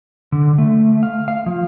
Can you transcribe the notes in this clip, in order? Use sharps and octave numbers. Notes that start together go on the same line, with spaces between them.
D3
A3
F5
F5
F3